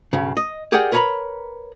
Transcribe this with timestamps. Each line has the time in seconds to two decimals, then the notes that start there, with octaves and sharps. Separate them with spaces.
0.13 B1 G2 C#3
0.37 D#5
0.72 G4 G#4 A#4 D5 F#5 G5
0.92 A#4 B4 C#5 G#5 A#5 B5